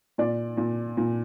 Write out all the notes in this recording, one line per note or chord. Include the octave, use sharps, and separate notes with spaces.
A#2 D5
A#2
A#2